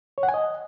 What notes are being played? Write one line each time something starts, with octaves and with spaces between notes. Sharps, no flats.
C#5
F#5
G#5
D#5